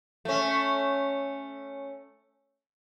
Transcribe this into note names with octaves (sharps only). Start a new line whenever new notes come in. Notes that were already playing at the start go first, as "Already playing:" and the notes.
A3 C#4